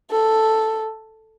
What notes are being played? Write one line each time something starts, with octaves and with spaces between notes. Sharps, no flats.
A4